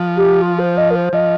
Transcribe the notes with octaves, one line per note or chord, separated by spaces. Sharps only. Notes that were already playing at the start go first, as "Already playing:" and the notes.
Already playing: F3
G4
F4
C5
D#5
A#4
C5
F3 D#5